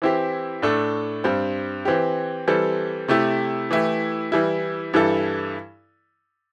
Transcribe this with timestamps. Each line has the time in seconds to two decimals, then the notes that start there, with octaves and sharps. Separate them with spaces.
0.02 E3 C4 E4 G4
0.62 A2 A3 D4 A4
1.24 G2 G3 C4
1.85 E3 C4 G4
2.48 E3 G3 C4 A4
3.08 C3 A3 E4 G4
3.71 E3 A3 E4 G4
4.32 E3 G3 E4
4.93 G2 E3 G3 E4 A4